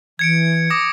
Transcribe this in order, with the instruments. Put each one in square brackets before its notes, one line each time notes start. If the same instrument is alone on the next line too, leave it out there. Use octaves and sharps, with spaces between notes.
[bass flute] E3 [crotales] G#6 C#7 D7
[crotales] D6 D#6 A#6